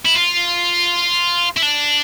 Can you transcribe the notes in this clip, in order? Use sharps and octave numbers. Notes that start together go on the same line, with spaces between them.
E4
F4
E4
D4